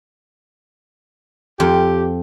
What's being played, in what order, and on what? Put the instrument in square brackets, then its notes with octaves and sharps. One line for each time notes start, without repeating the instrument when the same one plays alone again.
[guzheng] F2 [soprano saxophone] G4